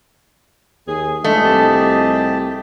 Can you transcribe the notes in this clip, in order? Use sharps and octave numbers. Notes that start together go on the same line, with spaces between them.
D#2 G#4
G2 F3 G#3 A3 G#4 D#5
C2 G4 A5